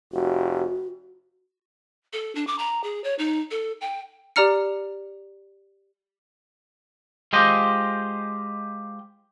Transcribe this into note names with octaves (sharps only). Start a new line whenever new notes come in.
F1 F#4
A4
D4
D6
A#5
G#4
C#5
D#4
A4
G5
G4 D5 A#5 F6 C#7
G#3 F4 G4 C5 D#5